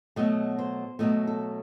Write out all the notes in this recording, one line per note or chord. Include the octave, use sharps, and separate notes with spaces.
B2 F#3 A3 D#5
C5
B2 F#3 A3 D#5
A4